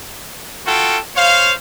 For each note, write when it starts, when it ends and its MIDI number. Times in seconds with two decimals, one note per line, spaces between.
0.66 0.99 65
0.66 0.99 66
0.66 0.99 69
0.66 0.99 79
1.15 1.53 72
1.15 1.53 73
1.15 1.53 77